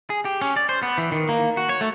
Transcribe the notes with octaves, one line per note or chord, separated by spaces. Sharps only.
G#4
G4
C#4
D5
C5
B3
E3
D#3
A#3
F#4
C#5
A3